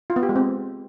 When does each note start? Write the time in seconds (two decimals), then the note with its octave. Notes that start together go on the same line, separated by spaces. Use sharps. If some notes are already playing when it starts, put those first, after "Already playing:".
0.10 F4
0.16 B3
0.23 G4
0.29 G#3
0.36 C4